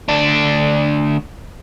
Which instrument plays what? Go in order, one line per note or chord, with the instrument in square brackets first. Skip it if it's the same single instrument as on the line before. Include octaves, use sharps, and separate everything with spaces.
[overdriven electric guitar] D2 D4